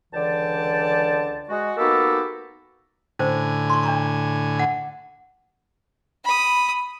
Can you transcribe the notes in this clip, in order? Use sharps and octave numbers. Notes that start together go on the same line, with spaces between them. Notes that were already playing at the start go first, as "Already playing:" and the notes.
C#2 D3 E3 D5 G5 A5
G#3 F#4
A#3 B3 D#4 F#4 G4 A4
A2 D3 C#4 C5 G#5
C6 C#6
D4 A#5 C#6
F#5
B5 D#6